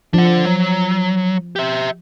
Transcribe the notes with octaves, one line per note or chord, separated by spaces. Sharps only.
F3 D4 F#5
F#3
G4 E5